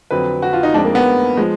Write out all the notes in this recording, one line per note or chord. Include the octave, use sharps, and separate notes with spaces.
F2 D3 F#3 B4
F#4
F4
D#4
F2 F3 G#3 D4
A#3
B3
F3 G#3